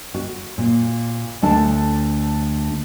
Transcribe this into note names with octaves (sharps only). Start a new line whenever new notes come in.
F#4
A#2
D2 A3 D4 A5